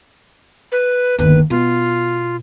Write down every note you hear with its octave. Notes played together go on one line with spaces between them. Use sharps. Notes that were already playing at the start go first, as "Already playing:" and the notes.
B4
G1 D#2 B4
B2 F4